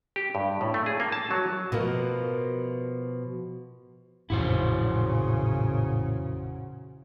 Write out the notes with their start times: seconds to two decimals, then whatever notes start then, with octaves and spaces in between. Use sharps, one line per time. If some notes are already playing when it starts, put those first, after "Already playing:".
0.16 G4
0.35 G2
0.61 A2
0.74 A3
0.86 G#4
1.00 A#3
1.12 A5
1.31 F#3
1.72 B2 F3 A#3
4.30 A1 F2 A#2 C#3 F3 E4 F#4 C5